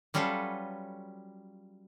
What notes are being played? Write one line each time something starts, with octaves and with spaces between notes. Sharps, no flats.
F#3 G3 C#4 F4 A4 B4